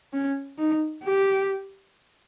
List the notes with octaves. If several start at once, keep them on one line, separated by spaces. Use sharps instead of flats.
C#4
D#4
G4